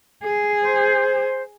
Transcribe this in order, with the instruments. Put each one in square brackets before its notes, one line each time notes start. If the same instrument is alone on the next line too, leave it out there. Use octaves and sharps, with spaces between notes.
[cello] G#4
[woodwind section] C5